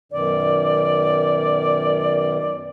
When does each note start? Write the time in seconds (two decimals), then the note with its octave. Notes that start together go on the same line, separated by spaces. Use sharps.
0.12 F#2 B2 D#3 D5